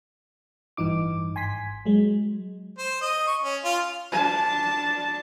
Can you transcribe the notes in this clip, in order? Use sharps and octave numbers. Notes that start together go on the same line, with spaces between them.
A1 G2 E3 D#4 D6
G#1 G#5 C6 B6
F#3 G#3
C5
D#5
C#6
C#4
F4
D4 A5